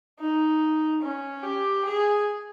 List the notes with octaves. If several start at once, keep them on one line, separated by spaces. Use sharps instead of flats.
D#4
C#4
G4
G#4